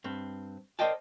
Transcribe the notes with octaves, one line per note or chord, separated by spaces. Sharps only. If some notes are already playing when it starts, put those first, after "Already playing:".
G2 C4
A#4 C5 D5 D#5 G5 A5